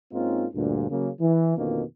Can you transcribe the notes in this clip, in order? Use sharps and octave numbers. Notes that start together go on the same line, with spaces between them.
G#2 A#3 C4 C#4 D#4 F4
D2 G2 A#2
C#3 F#3 A#3
E3
F2 B2 D3 D#3 F3 A#3